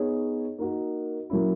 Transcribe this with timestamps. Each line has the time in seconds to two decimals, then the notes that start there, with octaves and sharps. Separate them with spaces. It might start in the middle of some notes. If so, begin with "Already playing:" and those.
Already playing: B3 D#4 G#4 C#5
0.59 A#3 D#4 F#4 A#4
1.30 F#3 A#3 C#4 E4